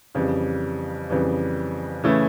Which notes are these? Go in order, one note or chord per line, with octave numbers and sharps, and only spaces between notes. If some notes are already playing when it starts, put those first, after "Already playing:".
F2 C#3 E3 G3
F2 C#3 E3 G3
C#3 E3 A3 C#4 E4